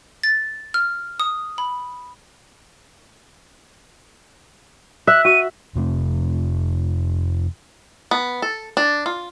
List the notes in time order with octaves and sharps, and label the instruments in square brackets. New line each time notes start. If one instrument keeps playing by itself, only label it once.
[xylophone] A6
F6
D#6
B5
[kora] E5 [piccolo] F#6
[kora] F#4 [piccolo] D#7
[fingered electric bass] F2 C3 A3 C4
[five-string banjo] B3
A4
D4
F4